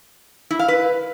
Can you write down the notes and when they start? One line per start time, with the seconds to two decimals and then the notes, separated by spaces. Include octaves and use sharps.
0.50 E4
0.59 F5
0.68 B4